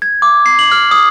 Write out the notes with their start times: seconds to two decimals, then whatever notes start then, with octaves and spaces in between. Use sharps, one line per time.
0.02 G#6
0.22 D6
0.46 C7
0.59 F#7
0.72 F6
0.91 D#6